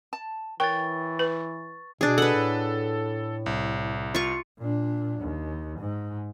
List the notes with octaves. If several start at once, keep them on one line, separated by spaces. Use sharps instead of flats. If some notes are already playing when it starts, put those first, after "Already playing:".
A5
E3 A#4 C#5 G5 C#6 A6
B4
B2 D4 G#4
A4 B4 F#5
A2
C2
F4 C#6
A#2 D4
D#2
G#2